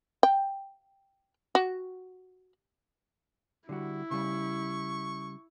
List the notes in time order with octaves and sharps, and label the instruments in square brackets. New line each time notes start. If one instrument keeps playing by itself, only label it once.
[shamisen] G5
F#4
[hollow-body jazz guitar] D3 G3 F#4 [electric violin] E4
[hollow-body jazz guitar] C#3 G3 [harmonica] C#6